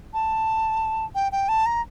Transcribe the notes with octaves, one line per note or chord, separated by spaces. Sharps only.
A5
G5
G5
A5
A#5